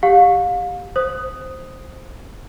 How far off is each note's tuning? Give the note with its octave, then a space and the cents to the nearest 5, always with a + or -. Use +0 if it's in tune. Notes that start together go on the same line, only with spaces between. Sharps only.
G4 +15 F5 +35
C5 +0 D#6 +0